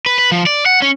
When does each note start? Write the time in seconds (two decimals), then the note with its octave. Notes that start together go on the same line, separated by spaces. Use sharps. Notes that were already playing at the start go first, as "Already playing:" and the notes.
0.06 B4
0.19 B4
0.31 F3
0.46 D5
0.66 F#5
0.82 C#4